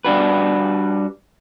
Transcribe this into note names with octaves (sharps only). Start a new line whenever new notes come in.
G3 D4 F#4 B4